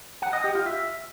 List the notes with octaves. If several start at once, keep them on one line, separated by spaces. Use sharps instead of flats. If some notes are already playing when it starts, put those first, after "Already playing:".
F#5
D#5
G4
F4
E5